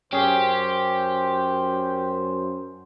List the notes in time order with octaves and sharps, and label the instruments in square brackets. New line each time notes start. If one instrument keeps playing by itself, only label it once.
[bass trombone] F#2 [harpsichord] C#4 G#4 [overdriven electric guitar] G4 [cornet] C5